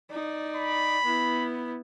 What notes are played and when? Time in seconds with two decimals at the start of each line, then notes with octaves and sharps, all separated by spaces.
0.11 D#4 D5
0.56 B5
1.04 B3 E4